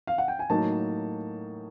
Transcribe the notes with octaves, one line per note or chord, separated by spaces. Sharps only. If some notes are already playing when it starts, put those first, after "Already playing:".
F5
F#5
G5
G#5
A2 F#3 A#3 D#4 A5